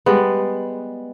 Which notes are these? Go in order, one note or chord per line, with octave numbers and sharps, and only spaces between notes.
G3 G#3 B3